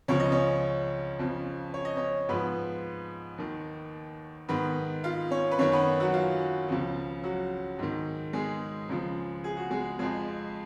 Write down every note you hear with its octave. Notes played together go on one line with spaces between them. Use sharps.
C#2 C#3 F3 C#5
D#5
C#4 C#5
F2 C#3 F3
C#5
D#5
C#4 C#5
G#2 F3 B3 B4
D#2 D#3
G#2 D#3 B3 B4
F4 F5
C#4 C#5
B4
F#2 D#3 C#4 C#5
B3 B4
F#3 F#4
F4
C#2 C#3 F3
F#3 F#4
G#2 D#3
G#3 G#4
C#2 C#3 F3
G#4
F#4
G#3 G#4
F2 F3 G#3 G#4